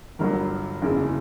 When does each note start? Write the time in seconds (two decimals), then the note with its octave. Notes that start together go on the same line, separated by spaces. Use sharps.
0.19 G1 G2 F#3 A#4
0.82 F#1 E2 C#3 E3